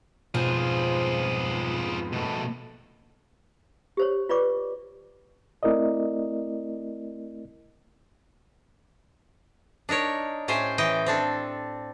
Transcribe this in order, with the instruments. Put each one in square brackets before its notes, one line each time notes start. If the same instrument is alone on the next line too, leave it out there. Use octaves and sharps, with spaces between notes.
[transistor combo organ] F2 G#2 B3 [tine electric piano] B2 [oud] F3 [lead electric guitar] F4 G#4
[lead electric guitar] B2 A3
[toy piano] G4 C5 C#5
F4 B4 C#5 D5 C#6 D6
[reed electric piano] A3 C4 E4 A#4 D5 D#5
[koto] D4 D#4 A#4 C#5
A2 C#4 G4 C5 G#5
E3 D#5 G5
C4 D4 A4